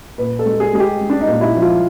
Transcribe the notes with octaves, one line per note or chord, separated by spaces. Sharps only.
A#2 B4
A4
G#3
G#4
G#3 G#4
G4
G#3
D4
D#4
A#2
E4
F3
F4